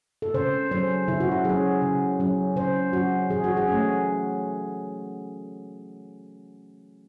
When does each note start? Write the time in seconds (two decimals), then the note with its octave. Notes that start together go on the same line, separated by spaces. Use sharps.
0.22 A4
0.34 C#3 C5
0.71 F#3 C#4 C5
1.08 C#3 E4
1.20 F#4
1.32 E4
1.45 F#3 C#4 G#4
1.82 C#3
2.20 F#3 C#4
2.56 C#3 C5
2.93 F#3 C#4 F#4
3.30 E3 G#4
3.44 F#4
3.57 G#4
3.68 A3 C#4